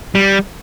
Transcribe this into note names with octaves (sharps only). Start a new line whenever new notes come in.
G3